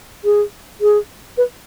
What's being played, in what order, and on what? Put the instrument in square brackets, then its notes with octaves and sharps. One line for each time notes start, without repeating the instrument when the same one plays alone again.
[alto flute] G#4
G#4
B4